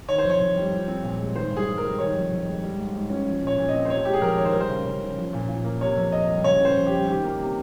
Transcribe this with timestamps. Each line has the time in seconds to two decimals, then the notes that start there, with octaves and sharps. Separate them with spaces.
0.08 D#3 C#5
0.18 F2 C5
0.30 C#5
0.40 F2
0.56 G3
0.72 F3
0.88 C4
1.03 A#2
1.19 G#3
1.35 D#3 C5
1.51 G2
1.57 G#4
1.67 G2
1.78 A#4
1.83 G3
1.99 D#3 C#5
2.15 F2
2.31 F2
2.47 G#3
2.62 G3
2.78 G#2
2.94 G#2
3.10 C#4
3.26 F3
3.42 A#2 C#5
3.58 A#2
3.69 D#5
3.74 C4
3.85 C5
3.90 C3 C#5
4.05 G#3 G4
4.14 G#4
4.21 F2 A#4
4.37 D#3 C#5
4.45 C5
4.53 G3 A#4
4.61 C5
4.69 C#3
4.85 C#3
5.01 C#4
5.16 F3
5.33 A#2
5.48 A#2
5.64 A#3
5.81 C3 C#5
5.96 F2
6.12 F2 D#5
6.29 G3
6.44 C#3 C#5
6.60 C#4 C5
6.76 F2
6.86 G4
6.92 G3
7.07 D#3 G4
7.24 A#3
7.40 C3